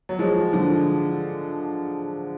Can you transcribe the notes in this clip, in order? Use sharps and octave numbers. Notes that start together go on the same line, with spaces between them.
F#3
F3 G#3
D3 F3